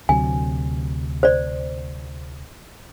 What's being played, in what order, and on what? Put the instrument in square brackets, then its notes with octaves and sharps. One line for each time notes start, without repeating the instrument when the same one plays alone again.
[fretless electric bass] D2 C3 F#3 [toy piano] G#5
[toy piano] C5 D5